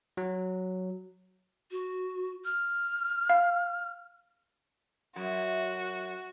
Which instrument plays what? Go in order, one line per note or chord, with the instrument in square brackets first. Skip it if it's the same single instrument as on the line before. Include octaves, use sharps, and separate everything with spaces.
[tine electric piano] F#3
[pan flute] F#4
F6
[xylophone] F5
[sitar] F#2 [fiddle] F#4